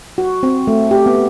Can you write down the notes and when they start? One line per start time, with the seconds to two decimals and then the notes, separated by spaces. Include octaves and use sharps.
0.18 F#4
0.43 C4
0.67 A3
0.91 G4
1.06 B3